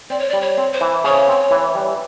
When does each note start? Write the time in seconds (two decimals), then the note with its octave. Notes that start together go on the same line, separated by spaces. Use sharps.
0.10 C4 D5
0.19 C#5
0.29 G3 D5
0.42 C#5
0.57 C4
0.73 C5
0.81 E3
1.04 C#3 C#5
1.28 C4
1.51 E3
1.75 G3